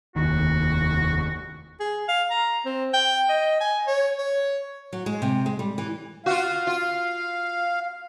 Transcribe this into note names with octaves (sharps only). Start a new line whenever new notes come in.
F1 D#2 D#3 F#4
G#4
F5
A#5
C4
G5
D#5
G#5
C#5
C#5
F#3
G#3
C3
G#3
G3
E3
F4 F#4 F5
F4